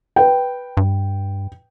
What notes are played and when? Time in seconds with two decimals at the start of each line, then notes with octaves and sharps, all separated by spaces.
0.16 B4 G5
0.77 G2